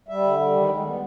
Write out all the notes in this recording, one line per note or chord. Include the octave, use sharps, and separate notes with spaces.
G3 E5
D3
G3
D#3
G#3
B3